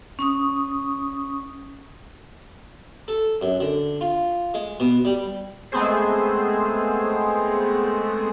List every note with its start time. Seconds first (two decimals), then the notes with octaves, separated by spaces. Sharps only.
0.19 C#4 C#6 D#6
3.08 A4
3.41 F#2
3.60 D3
4.01 F4
4.54 G#3
4.80 B2
5.05 G3
5.72 G#3 A3 B3 C4 G#4 C5